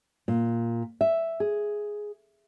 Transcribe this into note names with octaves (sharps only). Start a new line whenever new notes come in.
A#2
E5
G#4